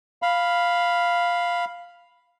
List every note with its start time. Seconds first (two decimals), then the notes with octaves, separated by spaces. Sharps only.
0.22 F5 B5